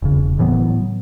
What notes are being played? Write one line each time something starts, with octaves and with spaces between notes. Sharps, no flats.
E1 C#3
A2 E3 F#3 B3